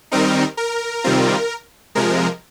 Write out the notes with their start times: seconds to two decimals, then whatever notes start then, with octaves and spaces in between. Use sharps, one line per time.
0.12 D#3 G3 C4 D#4 A#4
0.57 A#4
1.04 C3 D#3 G3 C4 F4
1.95 C3 F3 G#3 A#4